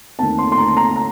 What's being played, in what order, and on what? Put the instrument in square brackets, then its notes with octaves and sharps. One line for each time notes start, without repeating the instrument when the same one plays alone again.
[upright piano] D#2 D#3 A3 C4 A5
C6
C6
D#2 D#3 A3 C4 A#5
A#5
A#5